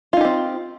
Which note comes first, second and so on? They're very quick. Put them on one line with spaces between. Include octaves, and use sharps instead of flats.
F4 D#4 G4 C4